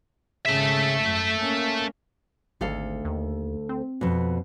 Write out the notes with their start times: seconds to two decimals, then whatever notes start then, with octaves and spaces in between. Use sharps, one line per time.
0.46 G#1 C#3 A3 E5
1.03 F#2
1.39 A#3 C#4
2.61 G#1 D2 A4 F5
3.05 D#2
3.69 C4
4.01 F2 B2